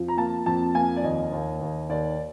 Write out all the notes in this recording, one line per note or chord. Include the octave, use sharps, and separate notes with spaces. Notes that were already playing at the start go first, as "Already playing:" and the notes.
Already playing: F2 F3
A#5
A#3 A5
F2 A5
A#3 G#5
D5
D#2 D#5
D#2
D#2
D#2 D5